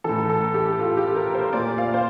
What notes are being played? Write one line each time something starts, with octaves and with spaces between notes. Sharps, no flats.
A2 E3 A4
A4
G4
F4
G4
A#4
C5
A#2 D5
F5
C5